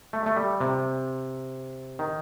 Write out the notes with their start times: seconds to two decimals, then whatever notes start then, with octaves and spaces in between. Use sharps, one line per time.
0.13 A3
0.26 A3
0.36 G3
0.61 C3
1.99 D#3